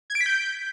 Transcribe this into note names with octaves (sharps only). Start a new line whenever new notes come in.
G#6
D7
B6
G6